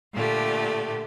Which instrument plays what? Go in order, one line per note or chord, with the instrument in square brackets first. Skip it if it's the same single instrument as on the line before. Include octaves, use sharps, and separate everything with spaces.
[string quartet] A#2 D3 A3 G4